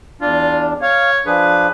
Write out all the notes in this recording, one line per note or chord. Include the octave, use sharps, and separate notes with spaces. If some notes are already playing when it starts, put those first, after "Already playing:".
E2 D4 F4
C#5 F5
F3 D4 G#4 B4